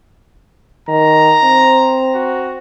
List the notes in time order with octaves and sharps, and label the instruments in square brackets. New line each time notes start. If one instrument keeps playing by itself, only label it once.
[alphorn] D#3 [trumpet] A#5
[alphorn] C4
[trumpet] F#4